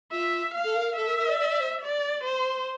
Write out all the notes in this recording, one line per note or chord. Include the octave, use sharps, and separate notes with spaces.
F4 E5
F5
A4
A#4
A4 E5
A#4
A#4
D5
D5
D5
C5
D5
C5